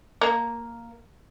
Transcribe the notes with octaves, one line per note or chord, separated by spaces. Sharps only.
A#3